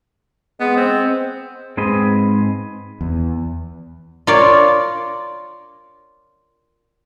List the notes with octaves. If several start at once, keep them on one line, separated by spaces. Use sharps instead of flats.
G#3 B3
C4
G#2 C4 G#4 B4 D#5
E2
F4 A#4 C#5 D5